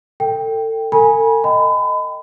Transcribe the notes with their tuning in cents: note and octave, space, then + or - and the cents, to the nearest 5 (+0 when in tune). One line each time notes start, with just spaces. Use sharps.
A4 +30 G5 +0
A4 +45 G#5 +0 B5 -35
D#5 +0 G5 +0 B5 +35